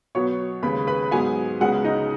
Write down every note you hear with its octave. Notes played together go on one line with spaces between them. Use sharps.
B2 F#3 B3 C#5 C#6
D#2 C#3 G#3 B4 B5
B4 B5
G#2 F#3 B3 G#4 G#5
C#2 C#3 G#3 B3 F#4 F#5
D#4 D#5